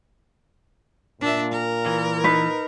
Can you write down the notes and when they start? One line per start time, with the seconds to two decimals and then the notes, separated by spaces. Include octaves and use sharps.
1.21 A#2 D4 E5
1.52 A#4
1.86 E3
2.24 D#4 B4